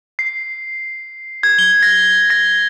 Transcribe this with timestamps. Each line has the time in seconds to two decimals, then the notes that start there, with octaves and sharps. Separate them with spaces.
0.19 C7
1.43 G#6
1.59 G7
1.82 A#6
2.30 A#6